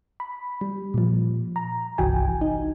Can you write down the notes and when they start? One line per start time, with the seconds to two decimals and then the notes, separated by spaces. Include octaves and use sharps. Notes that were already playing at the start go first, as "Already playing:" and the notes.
0.20 B5
0.61 G3
0.94 A#2 F3
1.56 A#5
1.98 G1 C2 E3 F#4 G5 G#5
2.41 D#4